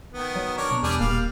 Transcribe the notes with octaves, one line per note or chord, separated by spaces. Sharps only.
D#3 B3
F#3
D4 A#4 C#5
B2
E2 G3 D4 G#4
D#1 G3 A#3 F5